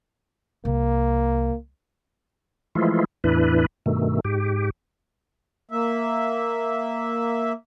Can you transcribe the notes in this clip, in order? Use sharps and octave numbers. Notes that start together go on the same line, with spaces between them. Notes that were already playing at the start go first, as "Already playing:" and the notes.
C2 A#3
E3 F3 G#3 A3 E4 F4
E2 A2 E3 D4 E4 B4
G2 B2 D#3 A3
G#2 G4
A#3 E5